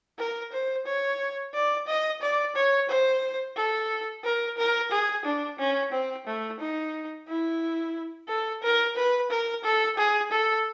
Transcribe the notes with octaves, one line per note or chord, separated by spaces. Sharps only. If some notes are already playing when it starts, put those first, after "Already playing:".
A#4
C5
C#5
D5
D#5
D5
C#5
C5
A4
A#4
A#4
G#4
D4
C#4
C4
A3
D#4
E4
A4
A#4
B4
A#4
A4
G#4
A4